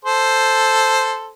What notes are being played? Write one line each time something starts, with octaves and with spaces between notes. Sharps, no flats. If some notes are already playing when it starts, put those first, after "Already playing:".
A4 C5